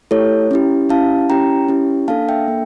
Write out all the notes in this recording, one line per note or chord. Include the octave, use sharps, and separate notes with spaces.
A3 E4 G4 A4 C#5
C#4 E4 G4
C#4 E4 G4 F5 A5
C#4 E4 G4 G5 A#5
C#4 E4 G4
A#3 D4 A4 F5 A5
E5 G5
A#3 D4 A4